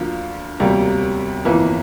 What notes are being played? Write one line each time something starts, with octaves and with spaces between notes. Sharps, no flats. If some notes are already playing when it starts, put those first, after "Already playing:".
Already playing: D2 D3 F3 A#3 F4
E1 D2 C3 G3 A#3
G1 F2 E3 A#3 E4